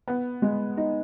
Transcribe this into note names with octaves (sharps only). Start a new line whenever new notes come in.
B3
G#3
D#4